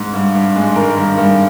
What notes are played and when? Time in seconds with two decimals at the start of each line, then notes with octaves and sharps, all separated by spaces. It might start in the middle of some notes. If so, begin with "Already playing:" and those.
Already playing: G#2
0.14 G2
0.35 G2
0.56 G#3
0.75 D#3 A#4
0.97 G2
1.18 G2